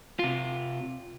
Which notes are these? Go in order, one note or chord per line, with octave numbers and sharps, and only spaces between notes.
C3 F4